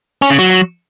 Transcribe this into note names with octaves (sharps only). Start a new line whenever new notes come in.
C#4
C#3
F#3